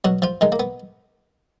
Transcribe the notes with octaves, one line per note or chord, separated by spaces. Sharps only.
B2 F#3 F#4
F3 F4
D#3 G#3 D#4
A#3
B3